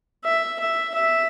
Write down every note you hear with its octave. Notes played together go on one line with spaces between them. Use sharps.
E5
E5
E5